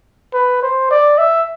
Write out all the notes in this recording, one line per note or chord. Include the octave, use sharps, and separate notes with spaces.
B4
C5
D5
E5